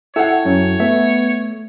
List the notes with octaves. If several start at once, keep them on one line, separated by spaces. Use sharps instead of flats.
E4 A4 C#5 E5 F#5 G5
F#2 C#4
A3 B3 E5